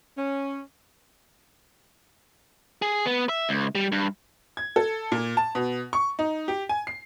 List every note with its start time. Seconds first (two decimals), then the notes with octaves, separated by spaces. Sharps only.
0.18 C#4
2.82 G#4
3.06 B3
3.29 E5
3.49 C#2
3.75 G3
3.92 G2
4.57 G#6
4.76 A4
5.12 A#2
5.37 A5
5.55 B2
5.93 C#6
6.19 D#4
6.48 G4
6.69 G#5
6.87 C7